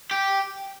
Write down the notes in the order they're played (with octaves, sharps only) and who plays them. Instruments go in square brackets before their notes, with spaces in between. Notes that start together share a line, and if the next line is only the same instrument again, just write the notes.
[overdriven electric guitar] G4